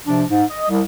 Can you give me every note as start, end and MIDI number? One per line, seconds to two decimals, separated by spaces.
0.08 0.24 48
0.08 0.24 53
0.08 0.24 62
0.30 0.44 44
0.50 0.65 75
0.69 0.82 36